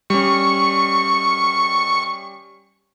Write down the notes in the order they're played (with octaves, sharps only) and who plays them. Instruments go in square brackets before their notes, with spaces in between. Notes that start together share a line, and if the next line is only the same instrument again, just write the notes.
[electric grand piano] G3 C#4 [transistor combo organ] C#6